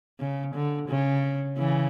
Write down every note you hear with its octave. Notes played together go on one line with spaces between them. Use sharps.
C#3
D3
C#3
C#3 E3